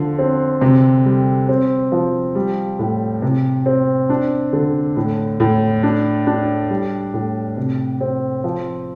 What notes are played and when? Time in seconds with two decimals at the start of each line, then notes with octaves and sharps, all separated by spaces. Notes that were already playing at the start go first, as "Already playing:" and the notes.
Already playing: D3 F3
0.19 C4
0.61 C3
1.05 G3
1.49 C4
1.92 F3
2.35 G3
2.79 A2
3.22 C3
3.66 C4
4.09 D4
4.53 D3
4.97 A2
5.40 A2
5.83 D4
6.27 D4
6.70 G3
7.14 A2
7.57 C3
8.01 C4
8.44 F3